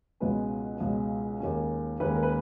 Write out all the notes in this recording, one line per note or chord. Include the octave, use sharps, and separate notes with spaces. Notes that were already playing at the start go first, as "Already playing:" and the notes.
C#2 B2 G#3 C#4 B4
C#2 B2 G#3 C#4
D#2 D#3 G#3 C#4
D#2 D#3 G#3 C#4 B4
A#4
B4